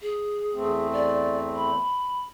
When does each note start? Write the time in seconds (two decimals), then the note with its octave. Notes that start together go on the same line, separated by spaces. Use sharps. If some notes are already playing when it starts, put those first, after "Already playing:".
0.01 G#4
0.54 E2 A3 C4
0.93 D5
1.56 B5